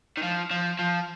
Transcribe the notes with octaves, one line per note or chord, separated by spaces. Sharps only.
D#3
F3
F3
F3